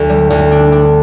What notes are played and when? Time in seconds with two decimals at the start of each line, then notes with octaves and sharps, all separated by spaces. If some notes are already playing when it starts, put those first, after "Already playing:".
Already playing: D2
0.09 G3
0.30 D2
0.51 D4
0.72 D4